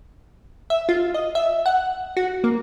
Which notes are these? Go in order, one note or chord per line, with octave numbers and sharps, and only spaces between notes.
E5
F4
D#5
E5
F#5
F#4
A#3